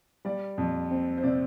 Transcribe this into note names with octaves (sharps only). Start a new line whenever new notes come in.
G3 D5
F2
C4
C5
C3 D5